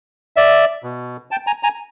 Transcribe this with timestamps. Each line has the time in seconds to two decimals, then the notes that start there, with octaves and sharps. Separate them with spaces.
0.36 D5 E5
0.84 B2
1.31 G5 A5
1.47 G#5 A#5
1.63 G#5 A#5